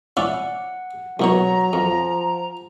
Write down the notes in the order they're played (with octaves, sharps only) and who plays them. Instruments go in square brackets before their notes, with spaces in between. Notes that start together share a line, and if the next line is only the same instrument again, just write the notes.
[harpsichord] C#4 E4 D5 [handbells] F#5
[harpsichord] C2 B2 C#5 [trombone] F#3 [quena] A#5
[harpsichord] F2 [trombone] F3